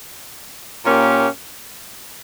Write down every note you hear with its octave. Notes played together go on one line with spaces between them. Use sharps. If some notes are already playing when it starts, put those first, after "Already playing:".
A#2 A#3 C#4 G4